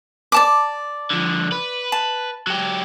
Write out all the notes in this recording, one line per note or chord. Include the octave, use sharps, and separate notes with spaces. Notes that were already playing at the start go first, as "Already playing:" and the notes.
D5 A5 D6
D3 F3
B4
A5
F#3 G4